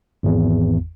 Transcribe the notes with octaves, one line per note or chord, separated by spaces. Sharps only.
G#1 E2